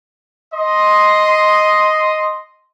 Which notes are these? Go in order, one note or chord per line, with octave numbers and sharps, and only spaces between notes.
D#5 C6